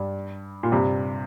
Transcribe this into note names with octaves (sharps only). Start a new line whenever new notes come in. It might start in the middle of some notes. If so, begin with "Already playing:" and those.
Already playing: G2
A#2
G2 C3